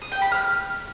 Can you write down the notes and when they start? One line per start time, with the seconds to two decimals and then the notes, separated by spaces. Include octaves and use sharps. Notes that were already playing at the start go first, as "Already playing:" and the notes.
0.02 D#6
0.12 G5
0.22 B5
0.32 F6